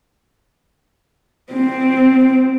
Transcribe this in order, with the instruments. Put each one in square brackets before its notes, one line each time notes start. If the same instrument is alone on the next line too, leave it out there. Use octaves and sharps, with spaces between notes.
[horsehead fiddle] C4